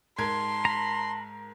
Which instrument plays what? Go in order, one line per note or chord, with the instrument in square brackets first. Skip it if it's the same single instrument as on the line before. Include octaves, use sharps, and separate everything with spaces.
[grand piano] G#2 A#4 G#6 [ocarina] A5 [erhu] C6
[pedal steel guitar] A#5 B5